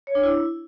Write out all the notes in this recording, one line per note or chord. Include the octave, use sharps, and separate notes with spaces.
C#5
D4
E4